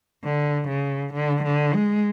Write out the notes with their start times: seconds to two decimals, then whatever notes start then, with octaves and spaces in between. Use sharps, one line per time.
0.24 D3
0.69 C#3
1.13 D3
1.44 D3
1.74 G#3